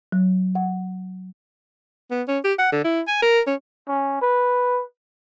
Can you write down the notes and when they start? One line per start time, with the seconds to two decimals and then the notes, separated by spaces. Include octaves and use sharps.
0.12 F#3
0.55 F#5
2.11 B3
2.28 C#4
2.44 G4
2.59 F#5
2.72 D3
2.84 E4
3.08 G#5
3.22 A#4
3.47 C#4
3.88 C#4
4.22 B4